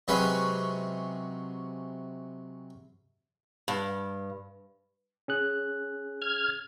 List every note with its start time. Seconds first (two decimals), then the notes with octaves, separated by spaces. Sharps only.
0.08 C3 F#3 G#3 C#4 G#4 B4
3.68 G2
5.28 C#4 G#4 F#6
6.22 F6 G#6